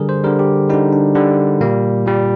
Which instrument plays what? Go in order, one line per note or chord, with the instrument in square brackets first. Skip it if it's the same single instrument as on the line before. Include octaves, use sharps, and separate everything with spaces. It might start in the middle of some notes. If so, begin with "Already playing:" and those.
Already playing: [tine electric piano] D3 G3 G#4 A#4
C5
D3 G3 A#4
G4
D3 G3 D#4
D4
D3 G3
A#2 G3 A#3
A#2 G3